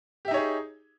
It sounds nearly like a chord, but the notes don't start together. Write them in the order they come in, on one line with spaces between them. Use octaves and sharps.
G4 E5 D#4 C#5 G#4